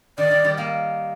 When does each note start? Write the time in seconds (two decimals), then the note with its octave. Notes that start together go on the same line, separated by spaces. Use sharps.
0.18 D#3 D5
0.31 D#3 G3
0.44 D#3 G3
0.57 G3 A#3